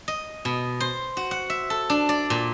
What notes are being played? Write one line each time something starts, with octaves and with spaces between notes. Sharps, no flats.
D#5
B2
C5
F#4
F#5
E5
A4
D4
D5
A#2